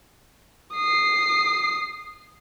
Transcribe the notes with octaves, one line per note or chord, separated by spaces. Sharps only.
D#6 C7